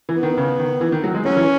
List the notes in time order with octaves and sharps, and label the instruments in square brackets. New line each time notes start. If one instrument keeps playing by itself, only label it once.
[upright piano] E3
[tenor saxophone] B3
[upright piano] D#3
C#3
D#3
E3
D#3
F#3
G#3
[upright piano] F#3 [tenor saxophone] C#4
[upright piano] E3